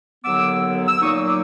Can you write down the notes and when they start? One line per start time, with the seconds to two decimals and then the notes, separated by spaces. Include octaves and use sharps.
0.24 D#2 D3 F#3 B3 D6 E6
0.88 E6
1.02 A#2 F#3 A#3 D#4 C#6 D#6
1.27 D6 E6